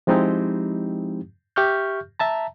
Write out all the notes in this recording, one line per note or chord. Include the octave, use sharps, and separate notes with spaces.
F3 G#3 C4 D#4 E4 G4
G4 E5 C#6 F6 G6
E5 A5 A#5